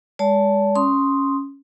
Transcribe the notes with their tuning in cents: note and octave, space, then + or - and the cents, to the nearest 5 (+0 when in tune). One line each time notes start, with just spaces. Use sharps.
G#3 -25 D5 -45 A5 +0
C#4 +0 C6 +0 D#6 +0